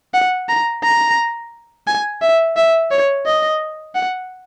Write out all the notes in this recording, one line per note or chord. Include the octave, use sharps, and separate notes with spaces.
F#5
A#5
A#5
G#5
E5
E5
C#5
D#5
F#5